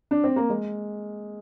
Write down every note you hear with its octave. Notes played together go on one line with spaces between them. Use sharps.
D4
C4
A#3
G#3